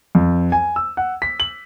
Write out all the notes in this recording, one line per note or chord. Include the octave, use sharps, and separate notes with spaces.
F2
G#5
E6
F#5
B6
F#7